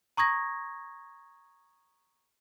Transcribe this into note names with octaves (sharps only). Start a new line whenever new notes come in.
A#5 C#6 D#6 G#6 A#6